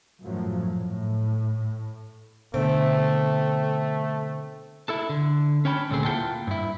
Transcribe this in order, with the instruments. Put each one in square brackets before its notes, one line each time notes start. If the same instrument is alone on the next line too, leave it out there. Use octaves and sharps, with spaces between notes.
[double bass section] F#2 A2 F3 F#3
A2
[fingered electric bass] B2 D3 [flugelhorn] A3 [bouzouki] C4
[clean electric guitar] E4 A4 A5
D3
C#4 C#5 G5 A5 B5
D2 A#2 A3 C4 G#4
A#3 E4 F4 F#5 G5 A5
G2 E4